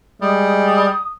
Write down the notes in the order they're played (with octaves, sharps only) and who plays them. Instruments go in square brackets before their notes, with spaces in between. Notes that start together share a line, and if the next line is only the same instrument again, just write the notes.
[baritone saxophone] G3 [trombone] G#3 [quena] D#6